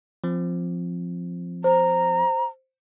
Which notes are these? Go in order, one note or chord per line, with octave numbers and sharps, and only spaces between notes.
F3 C4
C5 A#5